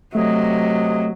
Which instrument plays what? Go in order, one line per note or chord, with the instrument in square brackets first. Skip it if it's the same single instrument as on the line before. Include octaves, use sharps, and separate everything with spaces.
[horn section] C3 D#5 [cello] F#3 [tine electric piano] A3